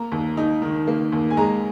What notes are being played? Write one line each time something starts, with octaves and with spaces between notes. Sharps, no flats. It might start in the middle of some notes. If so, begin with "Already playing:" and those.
Already playing: A#3 A#5
D#2
D#4
D#3
A#3
D#2
G#5
G#3 A#5